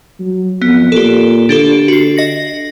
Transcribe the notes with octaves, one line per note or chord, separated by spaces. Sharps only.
F#3
F2 B3
A#2 G4 A4
D3 D4 G4 A4
F#4 C7
D#5 A#6